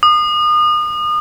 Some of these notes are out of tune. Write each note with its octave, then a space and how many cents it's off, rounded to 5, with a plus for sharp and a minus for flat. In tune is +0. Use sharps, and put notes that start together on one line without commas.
D#6 -35